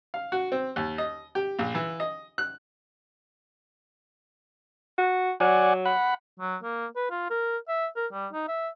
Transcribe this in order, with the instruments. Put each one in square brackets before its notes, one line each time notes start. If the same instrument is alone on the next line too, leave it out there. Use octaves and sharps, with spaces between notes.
[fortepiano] F5
F#4
C4
D#2
D#5
G4
A#1
E3
D#5
F#6
[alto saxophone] F#4
[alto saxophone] F#3 [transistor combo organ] D5 F#5 G#5
[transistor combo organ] F#5 B5
[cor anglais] F#3
A#3
B4
F4
A#4
E5
A#4
G3
D#4
E5